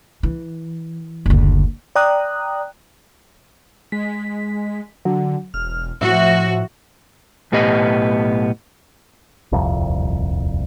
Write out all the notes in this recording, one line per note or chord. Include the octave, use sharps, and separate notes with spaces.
E3
F#1 D2
D5 G5 A#5 D#6 F#6
G#3 B6
D3 F#3
E1 F6
A2 F3 F#4 E5
B1 A2 B3 G4 D#5
D#1 C2 F2